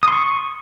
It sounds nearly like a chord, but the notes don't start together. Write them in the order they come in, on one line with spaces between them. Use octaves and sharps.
D#6 C6 C#6